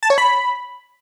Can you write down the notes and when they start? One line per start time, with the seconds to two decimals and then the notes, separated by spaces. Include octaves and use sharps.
0.03 A5
0.10 C#5
0.18 B5